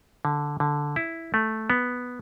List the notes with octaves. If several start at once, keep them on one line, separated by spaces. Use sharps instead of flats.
D3
D3
E4
A3
B3